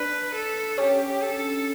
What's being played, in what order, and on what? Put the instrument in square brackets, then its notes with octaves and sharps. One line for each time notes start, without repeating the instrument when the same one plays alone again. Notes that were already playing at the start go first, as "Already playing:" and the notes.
Already playing: [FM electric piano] D4 [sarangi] B4
[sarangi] A4
[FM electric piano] C#4 [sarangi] G4
[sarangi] A4